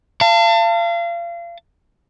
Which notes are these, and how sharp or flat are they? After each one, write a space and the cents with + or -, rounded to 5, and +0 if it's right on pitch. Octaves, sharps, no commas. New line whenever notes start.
F5 -35 A5 +30